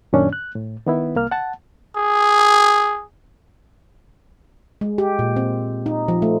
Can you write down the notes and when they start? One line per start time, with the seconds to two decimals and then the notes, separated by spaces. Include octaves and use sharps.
0.13 F#2 A#2 D#3 C#4 D4
0.33 F#6
0.55 A2
0.87 D#3 B3 E4
1.16 C2 A#3 F6
1.31 F#5 A5
1.96 G#4
4.81 G#3
4.98 G4
5.19 A#2
5.36 C4
5.86 D#4
6.08 F3
6.22 A3